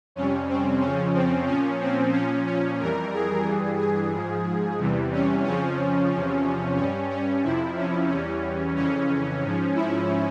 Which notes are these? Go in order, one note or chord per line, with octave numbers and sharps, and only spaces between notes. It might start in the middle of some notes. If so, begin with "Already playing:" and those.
F2 C3 G3 C#4
C4
F2 C#3 F3 C#4
C4
A#2 F3 C#4
C4
A#2 F3 C#4
C#4
F2 E3 G3 A#4
G#4
G2 E3 G3
G#4
G#2 F3
E2 C3 E3 G3
C#4
F2 C#3 F3 C#4
E2 C3 F3
G2 G3 C#4
C#4
F2 C3 F3 E4
C#4
E2 E3 G3 C#4
F2 C#3 E3 C#4
G#2 F3
E4